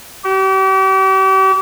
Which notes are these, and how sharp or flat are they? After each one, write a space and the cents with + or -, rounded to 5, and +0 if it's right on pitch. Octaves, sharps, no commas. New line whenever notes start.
G4 -40